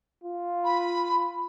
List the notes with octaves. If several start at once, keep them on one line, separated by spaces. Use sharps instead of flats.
F4
B5